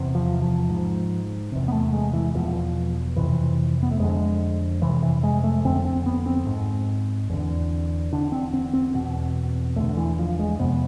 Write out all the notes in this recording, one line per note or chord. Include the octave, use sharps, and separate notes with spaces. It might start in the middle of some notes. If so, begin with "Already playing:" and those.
Already playing: E2 C3
F3
F3
G#2
E2 C3
B3
A3
G#3
E3
E2 B2 F3
F2 C3 E3
B3
A3
F2 D3 G#3
F2 C3 E3
E3
G#3
A3
F2 D3 C4
C4
B3
C4
G#2
E2 D3
E2 D3 D4
C4
C4
C4
E2 B2
E2 D3 A3
E3
F3
G#3
F2 C3 B3